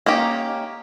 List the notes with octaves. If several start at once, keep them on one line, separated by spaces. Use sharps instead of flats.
A#3 C#4 D#4 G4